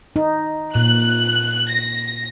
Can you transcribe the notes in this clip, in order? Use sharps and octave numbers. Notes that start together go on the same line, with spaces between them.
D#4
A#2 F#6
A#6